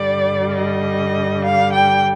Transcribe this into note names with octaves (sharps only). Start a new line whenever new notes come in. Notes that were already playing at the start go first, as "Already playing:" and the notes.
Already playing: G2 D3 G3 D5
D#5
F5
G5